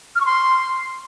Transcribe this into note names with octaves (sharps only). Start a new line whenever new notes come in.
F6
C#6
C6